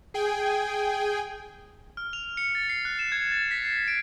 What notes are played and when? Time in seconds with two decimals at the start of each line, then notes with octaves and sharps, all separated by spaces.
0.14 G#4 G5 G#5
1.97 F6
2.13 F7
2.37 C#7
2.55 A6
2.69 C7
2.85 F#6
2.99 E7
3.12 G#6
3.32 A6
3.51 B6
3.65 C7
3.88 D7